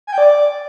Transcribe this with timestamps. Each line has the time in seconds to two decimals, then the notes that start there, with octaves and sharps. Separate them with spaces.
0.07 G#5
0.12 G5
0.18 D5